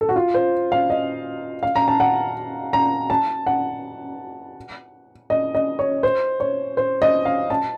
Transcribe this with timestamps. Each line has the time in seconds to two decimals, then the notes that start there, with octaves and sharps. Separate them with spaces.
0.01 A4
0.09 F#4
0.16 F4
0.34 C5
0.72 F5
0.90 D#5
1.63 F5
1.76 A#5
1.88 A5
2.00 F#5
2.73 A#5
3.10 A5
3.47 F#5
5.30 D#5
5.55 D#5
5.79 C#5
6.03 C5
6.40 C#5
6.77 C5
7.02 D#5
7.25 F5
7.50 A5